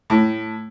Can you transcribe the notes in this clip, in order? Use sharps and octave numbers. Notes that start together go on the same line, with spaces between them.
A2